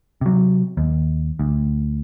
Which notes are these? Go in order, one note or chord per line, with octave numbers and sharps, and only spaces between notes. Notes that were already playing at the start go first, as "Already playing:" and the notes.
C3 F#3
D#2
D2